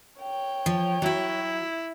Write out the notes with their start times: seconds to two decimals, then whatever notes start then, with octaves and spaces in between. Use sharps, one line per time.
0.21 C#5 G5
0.66 F3
1.02 F#3 E4 F#4